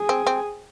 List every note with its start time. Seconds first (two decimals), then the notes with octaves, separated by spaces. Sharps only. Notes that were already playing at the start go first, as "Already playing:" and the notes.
Already playing: G#4
0.09 C4
0.27 C4